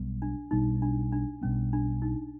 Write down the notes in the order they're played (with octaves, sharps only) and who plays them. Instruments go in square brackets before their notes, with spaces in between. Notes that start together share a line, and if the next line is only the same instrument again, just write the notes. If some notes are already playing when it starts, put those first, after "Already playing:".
Already playing: [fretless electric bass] B1 B2 G3 B3
[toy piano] D4
[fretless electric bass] B1 B2 G3 B3 [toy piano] D#4
[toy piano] D4
D4
[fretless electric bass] B1 B2 G3 B3 [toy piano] C#4
[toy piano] D4
D#4